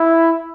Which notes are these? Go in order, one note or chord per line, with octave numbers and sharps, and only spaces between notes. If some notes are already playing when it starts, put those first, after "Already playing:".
Already playing: E4